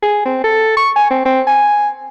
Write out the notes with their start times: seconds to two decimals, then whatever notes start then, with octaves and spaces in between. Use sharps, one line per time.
0.03 G#4
0.25 C4
0.44 A4
0.77 C#6
0.96 G#5
1.10 C4
1.25 C4
1.47 G#5